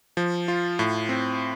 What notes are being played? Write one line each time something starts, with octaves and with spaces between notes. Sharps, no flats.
F3
F4
A2
C4